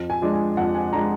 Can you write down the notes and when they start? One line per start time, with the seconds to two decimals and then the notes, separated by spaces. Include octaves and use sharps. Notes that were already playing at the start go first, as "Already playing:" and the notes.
Already playing: F2
0.10 G#5
0.22 F3 G#3 D4
0.33 G#5
0.57 F2 F#5
0.75 G#5
0.92 F3 G#3 D4 A#5